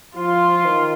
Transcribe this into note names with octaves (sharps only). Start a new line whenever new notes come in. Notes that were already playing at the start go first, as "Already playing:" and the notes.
F3 F4
D#3